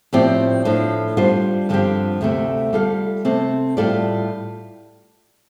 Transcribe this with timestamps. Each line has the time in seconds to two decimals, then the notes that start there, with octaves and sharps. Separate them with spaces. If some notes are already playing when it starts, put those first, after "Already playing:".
0.13 A2 F3 C4 G4 D5
0.65 A2 F3 D4
1.17 G3 D4 F4 C5
1.69 G2 D3 F3 C4 G4
2.21 D2 C3 A3
2.73 G3 F4 A4 F5
3.25 C3 A3 C4
3.77 A2 G3 F4 A4 D5